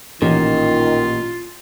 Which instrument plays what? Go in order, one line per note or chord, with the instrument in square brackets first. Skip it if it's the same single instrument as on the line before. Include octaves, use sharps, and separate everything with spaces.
[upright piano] A1 [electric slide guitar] A#2 [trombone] D#3 [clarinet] F4